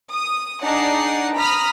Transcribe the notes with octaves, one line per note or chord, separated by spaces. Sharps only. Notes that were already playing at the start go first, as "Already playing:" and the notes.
D#6
D4 D#4 G#4 D5 F#5 C7
A#5 B5 D#6 F6 B6